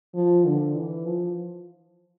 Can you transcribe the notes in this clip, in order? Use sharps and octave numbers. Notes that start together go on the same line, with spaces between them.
F3
D3
E3
F3